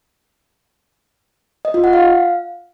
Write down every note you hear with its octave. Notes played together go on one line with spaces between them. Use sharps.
D#5
F4
F#5
F5